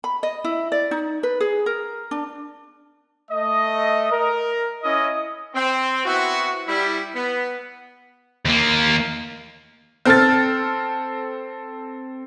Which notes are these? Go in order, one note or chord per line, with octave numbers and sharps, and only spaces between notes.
B5
D#5
E4
D5
D#4
B4
G#4
A#4
D4
A3 D#5
A#4
C#4 E4 D#5
C4
B3 C4 E4 F#4
G3 E4
B3
D#2 A#3
C4 A4 F6 A6